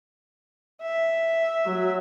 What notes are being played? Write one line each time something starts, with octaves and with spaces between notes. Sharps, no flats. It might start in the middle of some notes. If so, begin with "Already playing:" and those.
E5
F#3